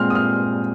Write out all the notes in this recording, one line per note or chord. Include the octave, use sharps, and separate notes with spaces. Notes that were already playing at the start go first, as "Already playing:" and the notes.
Already playing: A#2 G#3 C4 C6 F6
D#6
F6